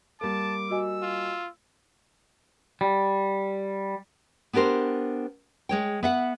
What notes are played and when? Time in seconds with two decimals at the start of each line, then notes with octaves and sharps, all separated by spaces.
0.21 G3 A#3 A5 D6
0.70 F#4 D#5 G#5 E6
1.02 F4
2.81 G3
4.53 B3 D4 G4 A#4 C5
5.69 G#3 C#5 G5
6.03 B3 E5 F#5